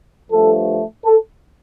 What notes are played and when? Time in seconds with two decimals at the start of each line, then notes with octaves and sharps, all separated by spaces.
0.30 G2 F3 A3 A4
1.04 A4